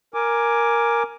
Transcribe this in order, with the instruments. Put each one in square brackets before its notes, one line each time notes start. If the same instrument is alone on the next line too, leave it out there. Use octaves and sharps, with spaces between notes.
[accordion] A#4 G#5 D6